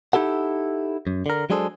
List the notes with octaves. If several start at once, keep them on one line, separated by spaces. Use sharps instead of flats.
D#4 E4 G4 A4 F#5
F#2
D3 A#4
F#3 G#3 D4 G#4 A4 C5